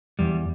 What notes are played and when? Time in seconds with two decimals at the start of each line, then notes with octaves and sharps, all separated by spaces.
0.19 E2 G3